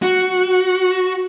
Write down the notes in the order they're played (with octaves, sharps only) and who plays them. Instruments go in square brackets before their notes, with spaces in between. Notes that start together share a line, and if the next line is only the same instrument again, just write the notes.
[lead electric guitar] F#4